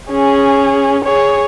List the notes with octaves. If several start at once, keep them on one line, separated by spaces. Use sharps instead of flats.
C#4 G#4
G#4 C#5